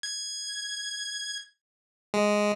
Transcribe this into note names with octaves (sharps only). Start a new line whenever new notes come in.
G#6
G#3